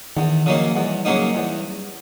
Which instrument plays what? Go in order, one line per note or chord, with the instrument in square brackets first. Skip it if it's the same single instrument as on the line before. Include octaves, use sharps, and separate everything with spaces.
[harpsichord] E2 [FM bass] D#3
[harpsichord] C#3 F#3 A#3 D#4 [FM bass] F3
[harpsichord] E2 [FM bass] G3
[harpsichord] C#3 F#3 A#3 D#4
E2